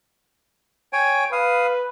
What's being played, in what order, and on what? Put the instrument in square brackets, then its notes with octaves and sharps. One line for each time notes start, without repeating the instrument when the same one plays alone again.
[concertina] C#5 G5 G#5
[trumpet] B4 [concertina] F5 D#6